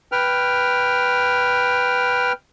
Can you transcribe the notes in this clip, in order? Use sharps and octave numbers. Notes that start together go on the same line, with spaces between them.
B4 G5 F6